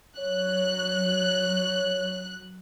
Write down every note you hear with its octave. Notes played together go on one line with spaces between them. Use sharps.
F#3 C#5 F#6